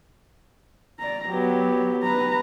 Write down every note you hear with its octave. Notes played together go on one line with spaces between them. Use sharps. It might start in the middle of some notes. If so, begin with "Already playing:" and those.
D5 A#5
F#3 B3 G4
B4 A#5